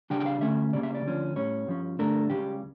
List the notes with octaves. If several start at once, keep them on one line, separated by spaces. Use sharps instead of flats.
C#3 G3 D4 G5
G5
F5
D2 D3 A3 C#4 E5
C#3 G3 A#3 C#4 D5
E5
D5
D2 D3 F3 C#4
A2 G3 C#4 C#5
G2 F3 C#4
G2 D3 A3 D4 A#4
C#2 C#3 G3 G4